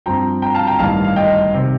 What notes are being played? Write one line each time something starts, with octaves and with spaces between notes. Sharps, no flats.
G2 F3 C4 G5 A#5
G5 A#5
F5 A5
G5 A#5
A1 G2 D#3 G3 D4 F5 A5
F5
D#5 G5
C3 D#3